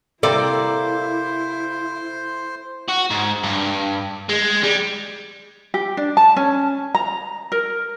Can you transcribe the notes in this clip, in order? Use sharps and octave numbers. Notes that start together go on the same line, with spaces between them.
C3 A#3 E4 A4 C5 D5
F#4
G#2
G2
G#3
G3
G4
D4
A5
C#4
A#5
A#4